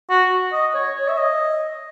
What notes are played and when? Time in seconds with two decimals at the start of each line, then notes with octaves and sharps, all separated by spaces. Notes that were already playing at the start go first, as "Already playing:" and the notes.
0.10 F#4
0.53 D#5
0.74 C#5
0.95 C#5
1.08 E5
1.17 D#5